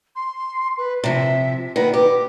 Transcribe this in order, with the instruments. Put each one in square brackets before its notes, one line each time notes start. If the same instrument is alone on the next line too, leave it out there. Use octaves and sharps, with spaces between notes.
[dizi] C6
B4
[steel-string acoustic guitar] C3 F3 [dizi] E5
[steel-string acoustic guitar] D#3 B3 B4 [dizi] D5
[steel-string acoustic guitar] G4 [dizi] D6